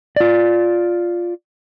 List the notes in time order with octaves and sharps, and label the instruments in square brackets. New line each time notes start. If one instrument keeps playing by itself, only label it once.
[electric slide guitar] F4 D5